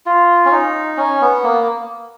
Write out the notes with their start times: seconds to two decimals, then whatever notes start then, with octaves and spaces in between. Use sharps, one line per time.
0.06 F4
0.45 C#4
0.51 D#4
0.97 C#4
1.21 B3
1.43 A#3